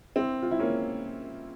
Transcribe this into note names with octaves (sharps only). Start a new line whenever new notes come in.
C4 E4
F4
E4
A#3 C#4